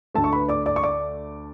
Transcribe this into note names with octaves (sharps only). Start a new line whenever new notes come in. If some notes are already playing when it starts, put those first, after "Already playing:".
D2 D3 A3 A4 A5
C#6
B4 B5
D5 D6
D5 D6
C#6
D5 D6